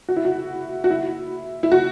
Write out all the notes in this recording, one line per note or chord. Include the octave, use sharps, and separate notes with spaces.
F#4
E4
F#4
F#4
E4
E4
F#4